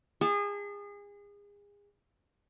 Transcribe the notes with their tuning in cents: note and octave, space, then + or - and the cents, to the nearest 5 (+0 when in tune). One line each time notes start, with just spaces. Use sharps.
G#4 -30 A5 -5